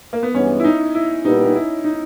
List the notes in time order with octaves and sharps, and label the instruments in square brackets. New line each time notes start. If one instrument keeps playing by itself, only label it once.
[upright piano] A#3
B3
[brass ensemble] G2 E3 G#3 B3 [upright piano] C#4
[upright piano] E4
D#4
E4
[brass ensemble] A#2 G3 B3 G4 B4 [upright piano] D#4
[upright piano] D#4
E4
D#4